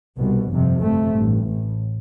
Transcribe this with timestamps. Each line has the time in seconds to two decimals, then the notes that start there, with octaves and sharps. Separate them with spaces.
0.18 C2 B2
0.50 G1 F2 C3
0.81 G1 F2 C3 A3
1.13 A1 G2
1.44 A1 A2